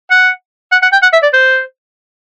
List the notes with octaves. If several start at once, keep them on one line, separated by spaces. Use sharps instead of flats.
F#5
F#5
F#5
G5
F#5
E5
D5
C5